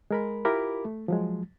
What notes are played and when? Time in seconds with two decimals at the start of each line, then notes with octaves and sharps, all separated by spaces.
0.11 G#3 A#4 B5
0.45 E4 F4 G4 A#4 B5 D6
0.85 A3
1.08 F3 F#3 G#3